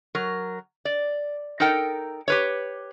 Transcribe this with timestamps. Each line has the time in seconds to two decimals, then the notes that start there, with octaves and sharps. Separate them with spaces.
0.15 F#3 A#4
0.85 D5
1.60 D#4 A4 A#4 G5
2.28 G4 B4 C#5